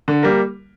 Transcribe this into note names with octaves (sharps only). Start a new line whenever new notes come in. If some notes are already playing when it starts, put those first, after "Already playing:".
D3
G3 A#3